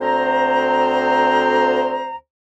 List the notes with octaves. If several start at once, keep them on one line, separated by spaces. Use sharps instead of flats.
D2 C4 C5 A#5